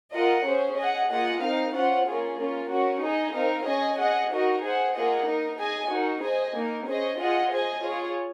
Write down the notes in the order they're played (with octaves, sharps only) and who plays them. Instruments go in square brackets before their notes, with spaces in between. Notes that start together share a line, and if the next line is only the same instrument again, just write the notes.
[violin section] F4 A#4 D#5 F#5
C#4 G#4 C5
G#4 D#5 F#5
A#3 F4 G#4 D#5 F#5
C4 D#4 A#4 F5
C#4 F4 C5 F#5
A#3 C#4 F4 G#4
A#3 C#4 F4
C#4 F#4 A#4
D#4 G#4 D#5
C4 D#4 A#4 F5
C#4 G#4 D#5 G#5
G#4 D#5 F#5
D#4 F#4 A#4 D#5
G#4 C5 F#5
A#3 F4 G#4 D#5 F#5
D#4 A#4 D#5
G#4 D#5 G#5
D#4 F#4 A#4
G#4 C5 D#5 G#5
A#3 D#4 A#4
C#4 G#4 C5 D#5
F4 G#4 D#5 F#5
G#4 C5 D#5 G#5
F4 G#4 C#5